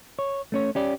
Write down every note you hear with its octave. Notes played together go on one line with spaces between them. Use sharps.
C#5
A3 C#4 C#5
C#4 G4 D5